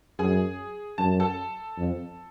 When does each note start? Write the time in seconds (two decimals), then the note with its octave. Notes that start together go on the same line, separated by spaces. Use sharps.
0.19 F#2 G#4 G#5
0.98 F#2 A5
1.20 A4 A5
1.77 F2